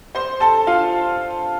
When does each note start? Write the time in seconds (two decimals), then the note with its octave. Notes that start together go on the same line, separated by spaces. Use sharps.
0.15 C5 C6
0.40 A4 A5
0.67 F4 F5